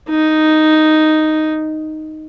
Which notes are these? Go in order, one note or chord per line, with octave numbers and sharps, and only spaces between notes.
D#4